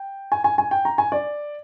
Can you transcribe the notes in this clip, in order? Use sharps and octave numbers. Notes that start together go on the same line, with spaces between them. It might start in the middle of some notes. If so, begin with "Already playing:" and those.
Already playing: G5
G#5
G#5
G#5
G5
A#5
G#5
D5